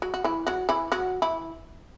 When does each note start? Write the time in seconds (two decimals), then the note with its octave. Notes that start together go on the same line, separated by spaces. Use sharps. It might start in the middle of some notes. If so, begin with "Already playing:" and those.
0.02 F#3 F#4
0.14 F#4
0.24 E3 E4
0.47 F#3 F#4
0.69 E3 E4
0.92 F#3 F#4
1.22 E3 E4